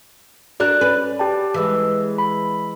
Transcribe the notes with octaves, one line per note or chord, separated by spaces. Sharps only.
D4 F#4 A#4 D5 F#6
C#4 B4
G4 G5 A5
E3 G#3 B4 E6
B5